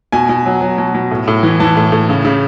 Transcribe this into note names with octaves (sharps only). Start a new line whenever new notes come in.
B2 G#5
B2
F#3
F#3
B2
B2
A2
A2
E3
E3 A5
A2
A2
C#3
C#3